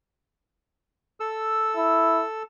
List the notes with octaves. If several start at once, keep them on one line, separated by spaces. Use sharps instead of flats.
A4 E6
E4